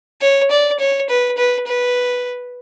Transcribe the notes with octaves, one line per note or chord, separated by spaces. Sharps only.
C#5
D5
C#5
B4
B4
B4